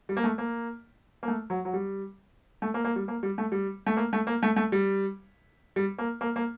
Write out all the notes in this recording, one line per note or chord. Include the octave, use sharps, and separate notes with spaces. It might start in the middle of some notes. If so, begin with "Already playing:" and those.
G3
A#3
A3
A#3
A#3
A3
F#3
F#3
G3
A3
A#3
A#3
G3
A#3
G3
A3
G3
A3
A#3
A3
A#3
A3
A3
G3
G3
A#3
A#3
A#3